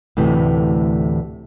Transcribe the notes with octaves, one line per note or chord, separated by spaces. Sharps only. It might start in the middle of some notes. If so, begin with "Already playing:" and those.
D2 A2 C3 E3